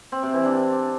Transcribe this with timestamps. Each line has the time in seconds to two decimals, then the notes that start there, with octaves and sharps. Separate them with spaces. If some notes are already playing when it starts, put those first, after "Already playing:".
0.12 C4
0.23 C3
0.34 E3
0.45 D4